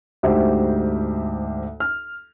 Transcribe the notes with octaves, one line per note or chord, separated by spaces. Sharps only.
D2 G#2 G4 C5 E5
F6